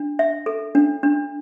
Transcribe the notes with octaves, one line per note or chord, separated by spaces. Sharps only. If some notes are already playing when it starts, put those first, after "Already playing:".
Already playing: D4
E5
A4
D4
D4